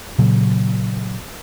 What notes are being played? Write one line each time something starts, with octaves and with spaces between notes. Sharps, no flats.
A#2 C#3 F#3